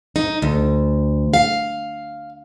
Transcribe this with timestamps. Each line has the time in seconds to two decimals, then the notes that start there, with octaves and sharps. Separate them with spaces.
0.16 D#4
0.42 D2
1.34 F5